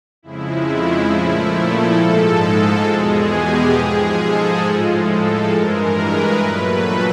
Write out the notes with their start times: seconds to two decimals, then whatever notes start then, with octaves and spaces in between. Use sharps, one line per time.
0.23 F2 C#3 F3 G#3 E4
1.11 A#2 F3 A3
1.55 A4
1.98 G#2 F3 G#3
2.42 A4
2.86 E2 B2 G#3 G#4
3.30 G4
3.74 G#2 F3 G#3 G#4
4.18 A4
4.62 A2 F3 G#3
5.05 A4
5.49 G2 E3 G#3 A#4
5.93 B4
6.37 A#2 F#3 A3 B4
6.81 B4